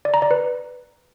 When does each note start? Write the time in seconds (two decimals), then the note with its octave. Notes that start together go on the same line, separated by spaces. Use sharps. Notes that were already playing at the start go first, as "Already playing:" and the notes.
0.05 D5
0.14 A#5
0.22 D5
0.31 B4